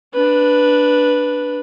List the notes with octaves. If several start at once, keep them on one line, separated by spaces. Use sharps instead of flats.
D4 B4